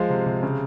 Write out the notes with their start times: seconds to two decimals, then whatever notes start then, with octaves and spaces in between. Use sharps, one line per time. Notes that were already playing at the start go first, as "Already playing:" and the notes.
Already playing: F3 G#3 F5
0.09 C3
0.26 C3
0.43 C#3